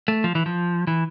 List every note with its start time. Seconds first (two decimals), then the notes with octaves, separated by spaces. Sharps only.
0.08 A3
0.24 F3
0.35 E3
0.46 F3
0.87 E3